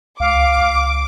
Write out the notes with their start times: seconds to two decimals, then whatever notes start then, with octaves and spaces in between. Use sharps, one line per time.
0.20 C#2 F5 D6
0.58 C#2